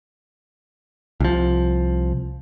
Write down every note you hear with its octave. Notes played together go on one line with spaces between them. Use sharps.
C2 F3